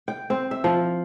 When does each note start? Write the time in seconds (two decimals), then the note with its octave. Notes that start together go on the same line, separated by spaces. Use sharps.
0.08 G5
0.30 C4
0.51 E5
0.64 F3